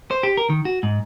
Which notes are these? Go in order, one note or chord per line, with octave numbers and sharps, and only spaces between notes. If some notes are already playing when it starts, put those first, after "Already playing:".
C5
G4
A#4
D#3
F#4
G#2